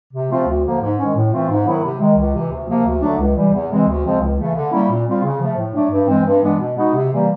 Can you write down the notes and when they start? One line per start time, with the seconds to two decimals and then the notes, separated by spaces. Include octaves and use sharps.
0.14 C3
0.30 F3 A3 C4 F4
0.47 D2
0.63 D3 F3 A#3
0.80 G#2
0.99 D#3 G#3 C#4
1.15 A2
1.32 E3 A3 C4 F4
1.50 G#2
1.65 D#3 F#3 B3 E4
1.83 C3
2.00 D#3 G#3
2.16 C#2
2.35 C3 E3
2.51 D2
2.67 C3 F3 A#3
2.86 D2
3.02 D3 F#3 A3 D4
3.19 C#2
3.36 C3 E3 G3
3.53 E2
3.69 C3 E3 G#3 C4
3.87 D2
4.04 C#3 F3 G#3 C4
4.20 C#2
4.39 C#3 E3 A3
4.55 D3
4.72 G3 A#3 C#4 E4
4.89 A#2
5.06 G3 C4 F4
5.23 C#3
5.41 F3 A3
5.57 A2
5.75 F#3 A3 D4
5.91 G2
6.07 E3 G#3 C4
6.25 G2
6.41 E3 G#3 B3 D4
6.59 B2
6.76 G#3 B3 D#4 F#4
6.94 C3
7.10 E3 G3 A#3